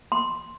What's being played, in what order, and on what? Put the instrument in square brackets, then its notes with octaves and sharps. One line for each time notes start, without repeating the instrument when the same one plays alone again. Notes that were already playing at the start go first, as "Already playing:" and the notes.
[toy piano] C6